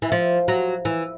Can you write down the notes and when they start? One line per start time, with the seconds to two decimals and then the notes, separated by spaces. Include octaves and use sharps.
0.02 E3
0.12 F3
0.48 F#3
0.85 E3